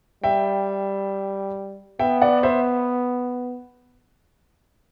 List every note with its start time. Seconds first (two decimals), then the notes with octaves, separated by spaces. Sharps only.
0.23 G3 E5 G5
1.99 B3 E5 G5
2.22 D5 F#5
2.43 C5 E5